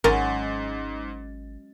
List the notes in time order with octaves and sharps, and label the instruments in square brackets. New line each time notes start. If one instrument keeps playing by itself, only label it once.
[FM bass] G#1 [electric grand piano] G#2 A6 [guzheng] F#3 G#3 C#4 [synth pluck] A#4